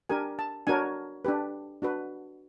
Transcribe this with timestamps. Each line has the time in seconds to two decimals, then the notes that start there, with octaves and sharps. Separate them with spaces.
0.09 D4 G4 A#4 G#5
0.39 A5
0.67 D4 F#4 A#4 C#5 G#5
1.25 D4 G4 B4
1.82 D4 F#4 B4